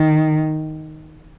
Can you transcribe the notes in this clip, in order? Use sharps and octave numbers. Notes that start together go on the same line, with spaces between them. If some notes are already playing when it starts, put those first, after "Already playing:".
Already playing: D#3